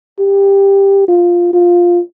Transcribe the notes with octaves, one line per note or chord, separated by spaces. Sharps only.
G4
F4
F4